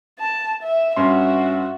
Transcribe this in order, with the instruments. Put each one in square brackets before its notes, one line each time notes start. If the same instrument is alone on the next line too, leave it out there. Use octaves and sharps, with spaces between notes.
[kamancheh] A5
E5
[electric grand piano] G2 C#4 C6 [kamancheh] F#4 E5